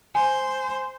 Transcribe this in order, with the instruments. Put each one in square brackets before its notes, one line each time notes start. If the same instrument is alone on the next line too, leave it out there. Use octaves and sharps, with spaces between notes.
[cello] C5 [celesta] G#5